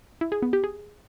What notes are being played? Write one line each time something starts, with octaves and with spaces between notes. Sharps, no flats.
E4
G#4
B3
G4
G#4